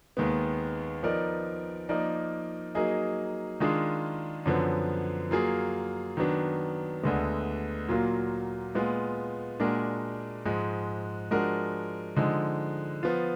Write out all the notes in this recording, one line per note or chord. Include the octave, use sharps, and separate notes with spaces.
D#2 D#3 G#3 B3
F3 B3 D#4 A#4 D5
F3 A#3 D#4 A#4 D5
F#3 A#3 D#4 G#4 D#5
D#3 G#3 D4 F4 G#4
F#2 D3 F3 B3
F#3 A#3 F4 G#4
D#3 F#3 B3 D4
D2 D3 G#3 B3
A#2 F#3 A#3 F4
A#2 G#3 B3 F4
A#2 G#3 D4 F#4 A#4
G#2 F3 G#3
F3 G#3 D4 F#4 A#4
D3 F3 G#3 D#4
F3 B3 F4